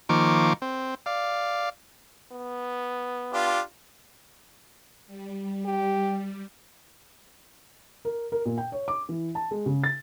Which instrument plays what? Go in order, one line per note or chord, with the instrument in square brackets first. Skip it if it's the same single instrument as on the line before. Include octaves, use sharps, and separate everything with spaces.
[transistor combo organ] D#3 F3 A#3 C#6 D6
C4
D5 F5
[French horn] B3
[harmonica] D4 F4 G4
[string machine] G3
[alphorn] G4
[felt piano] A#4
A#4
A#2
G5
C#5
D6
E3
A5
G#3
C#3
A6